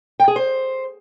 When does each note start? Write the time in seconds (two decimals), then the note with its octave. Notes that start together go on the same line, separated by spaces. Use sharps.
0.20 G5
0.28 G#4
0.36 C5